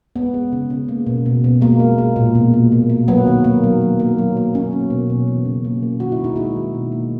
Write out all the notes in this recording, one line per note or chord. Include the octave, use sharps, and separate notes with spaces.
G#3 B3
G#3
C#3
C#3
A#3
B2
B2
B2
G#3 A#3
G#3
G#3
A#2
B2
A#3
B2
A#3
F#3 B3
D#3
A#3
F#3
F#3
A#3
F#3
A#3
A#3 C#4
A#3
B2
B2
E3
C#3
A#3
A#3
D#3 F#4
E4
G#3
D#4
G#3 E4
D#3
B2
A#3